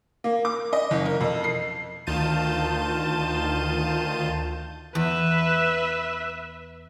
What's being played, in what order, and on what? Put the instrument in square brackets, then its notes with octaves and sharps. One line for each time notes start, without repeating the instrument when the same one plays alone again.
[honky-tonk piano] A#3
D6
D#5
F#1
A#4
F2
C7
[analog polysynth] D2 D#3 F4 A5 G6 D#7
[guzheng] E2 [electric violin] B4 E5